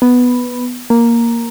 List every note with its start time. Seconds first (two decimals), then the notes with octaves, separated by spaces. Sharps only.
0.02 B3
0.90 A#3